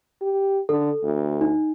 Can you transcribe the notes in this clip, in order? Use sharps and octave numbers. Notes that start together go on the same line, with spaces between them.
G4
D3 A4
D2
D#4